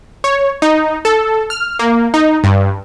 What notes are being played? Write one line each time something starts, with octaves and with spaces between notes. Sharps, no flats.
C#5
D#4
A4
F6
A#3
D#4
G2